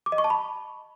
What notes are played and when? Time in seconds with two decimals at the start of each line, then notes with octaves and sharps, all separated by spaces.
0.06 D6
0.12 D#5
0.18 C#6
0.24 A5
0.30 B5